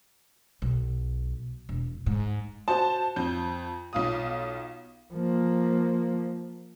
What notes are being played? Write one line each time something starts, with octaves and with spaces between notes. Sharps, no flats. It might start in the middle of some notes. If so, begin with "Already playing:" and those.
B1
E1
G#2
F#4 C5 A5
F2 G6
B1 F4 D#6
F3 A#3